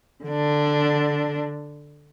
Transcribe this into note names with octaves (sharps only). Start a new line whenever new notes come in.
D3 D4